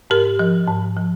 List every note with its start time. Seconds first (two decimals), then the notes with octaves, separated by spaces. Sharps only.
0.10 G#2 G4 A#4
0.39 F3
0.68 G#2
0.96 F3